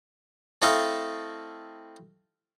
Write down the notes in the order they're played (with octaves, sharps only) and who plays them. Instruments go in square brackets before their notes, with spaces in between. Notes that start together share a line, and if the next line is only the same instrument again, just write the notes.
[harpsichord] A3 C4 E4 A4 D#5 F5